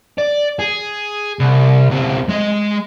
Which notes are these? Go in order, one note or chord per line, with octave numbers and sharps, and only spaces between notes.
D5
G#4
C2
C#2 C4
G#3 D#5